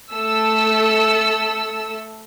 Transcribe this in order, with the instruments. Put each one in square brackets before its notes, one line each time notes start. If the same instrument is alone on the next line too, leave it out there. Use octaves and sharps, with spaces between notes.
[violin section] A3 A4 E6